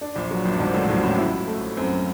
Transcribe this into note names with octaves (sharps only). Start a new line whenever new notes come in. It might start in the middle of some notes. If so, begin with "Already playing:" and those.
D4
A#1 A#2
F#3
A#1 A#2
G2
G#1 G#2 D4
A1 A2
A1 A2 F#3
A1 A2
E4
A3
F#2 C4